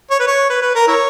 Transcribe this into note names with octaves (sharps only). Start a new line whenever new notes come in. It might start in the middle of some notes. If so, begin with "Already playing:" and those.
C#5
B4
C#5
B4
B4
A#4
E4 A#4 C#5